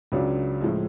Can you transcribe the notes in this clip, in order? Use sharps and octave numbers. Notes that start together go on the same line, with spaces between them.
C#2 C#3 F#3 D4
A2 F3 G#3